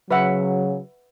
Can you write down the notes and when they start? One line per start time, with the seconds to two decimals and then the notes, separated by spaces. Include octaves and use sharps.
0.11 C#3 F#3 B4 E5 F#5